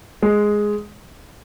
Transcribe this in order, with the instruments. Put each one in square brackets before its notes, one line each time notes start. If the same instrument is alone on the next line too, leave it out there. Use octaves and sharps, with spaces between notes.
[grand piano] G#3